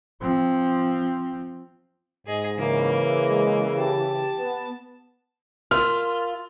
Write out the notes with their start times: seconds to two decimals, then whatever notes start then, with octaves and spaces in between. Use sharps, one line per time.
0.21 F3 C4
2.27 G#2 G#4 D#5
2.58 C#3 E3 A#3
3.28 G#3
3.78 G4 A5
4.38 B3
5.71 F4 A#4 E6 F6